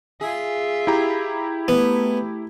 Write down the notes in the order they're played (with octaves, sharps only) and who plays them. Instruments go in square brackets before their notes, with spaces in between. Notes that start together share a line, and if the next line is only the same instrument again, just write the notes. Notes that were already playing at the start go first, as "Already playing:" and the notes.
[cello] F4 E5 [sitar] G#4
[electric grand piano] E4 G4 A#5
[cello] A3 [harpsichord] B3